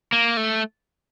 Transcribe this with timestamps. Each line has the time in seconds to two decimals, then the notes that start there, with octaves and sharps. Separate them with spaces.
0.13 A#3
0.37 A3